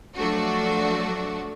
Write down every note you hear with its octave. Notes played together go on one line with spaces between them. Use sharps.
F3 F#3 A3 D4 F#4